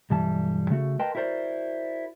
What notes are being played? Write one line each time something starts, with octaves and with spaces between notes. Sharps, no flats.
B1 G2 E3 G3 A5
C#3 A3 F#4
A#4 B4 D#5 G5 A5 C6
E4 F#4 A#4 C5 D5